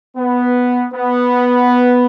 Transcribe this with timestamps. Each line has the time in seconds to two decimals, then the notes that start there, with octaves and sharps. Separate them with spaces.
0.17 B3
0.94 B3